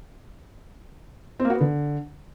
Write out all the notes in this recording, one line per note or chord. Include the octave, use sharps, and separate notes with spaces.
C4
A#3
F#4
B3
D3